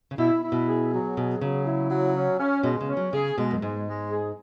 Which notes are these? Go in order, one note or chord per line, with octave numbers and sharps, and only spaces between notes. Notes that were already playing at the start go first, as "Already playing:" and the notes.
C#3
B2 E4
E4
B2
G#4
F#3
B2 G#4
C#3 F#3
E4
F#3
C#4
C#4
B2 G#3
C#3
C#4
F#3
C#3 G#4
B2 G#3
F#2
G#2 G#3
G#3
G#4